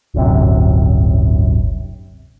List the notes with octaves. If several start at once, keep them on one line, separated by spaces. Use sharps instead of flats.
D1 G1 F#2 C3